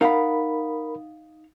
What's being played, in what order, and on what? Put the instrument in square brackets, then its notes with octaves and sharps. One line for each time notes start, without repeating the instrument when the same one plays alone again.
[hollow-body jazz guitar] D#4 F5 F#5 [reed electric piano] A#4 B5